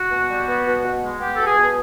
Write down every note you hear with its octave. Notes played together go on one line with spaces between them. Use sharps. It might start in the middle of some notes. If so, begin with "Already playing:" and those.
Already playing: F#4
B2
G3
B3
B2
B2
G#3
B3 G4
B2 A4
G#4
B2